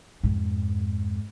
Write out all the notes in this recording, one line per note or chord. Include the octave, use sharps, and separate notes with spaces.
F2 G#2